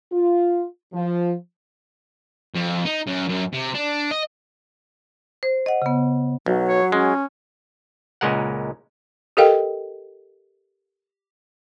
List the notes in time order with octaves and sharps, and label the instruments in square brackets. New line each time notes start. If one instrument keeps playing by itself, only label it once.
[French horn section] F4
F3
[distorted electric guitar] F2
D#4
F#2
F#2
C3
D4
D#5
[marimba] C5
D#5 F#5
C#3 B3
[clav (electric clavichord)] B1 [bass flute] F#3
[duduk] C#5
[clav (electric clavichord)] G#3 [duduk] C#4
[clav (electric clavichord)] C#2 A#2 G#3 A#4 F#5
[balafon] G4 A4 A#4 D#5 F5 G5